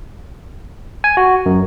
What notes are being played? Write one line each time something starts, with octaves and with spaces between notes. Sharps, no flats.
G#5
F#4
F#2